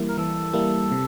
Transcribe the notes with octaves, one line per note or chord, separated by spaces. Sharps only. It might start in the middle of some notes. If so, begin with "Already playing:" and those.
Already playing: E3 G3 A#3 E4
A#4
E3 A4
G3 A#3 E4
C3